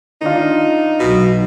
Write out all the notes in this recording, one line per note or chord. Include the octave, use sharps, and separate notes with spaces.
D#3 D4 D#4 F4
B1 B2